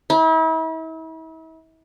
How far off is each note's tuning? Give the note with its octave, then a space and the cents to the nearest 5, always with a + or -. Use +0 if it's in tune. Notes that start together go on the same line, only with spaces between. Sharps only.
E4 -40